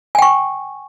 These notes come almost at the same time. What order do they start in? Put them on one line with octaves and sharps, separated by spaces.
G#5 G5 C#6